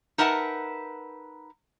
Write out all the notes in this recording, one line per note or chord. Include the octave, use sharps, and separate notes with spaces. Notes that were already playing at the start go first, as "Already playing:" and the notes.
D#4 A#4 B4 E5 F#5 A5